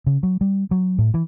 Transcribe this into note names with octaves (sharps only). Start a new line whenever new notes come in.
C#3
F#3
G3
F#3
A2
E3